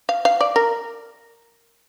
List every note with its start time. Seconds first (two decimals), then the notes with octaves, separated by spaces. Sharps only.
0.09 F5
0.25 F5
0.41 D5
0.56 A#4